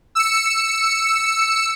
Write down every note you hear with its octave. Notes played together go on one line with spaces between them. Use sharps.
E6 C#7